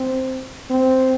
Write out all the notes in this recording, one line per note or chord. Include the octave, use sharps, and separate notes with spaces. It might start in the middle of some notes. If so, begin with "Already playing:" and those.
Already playing: C4
C4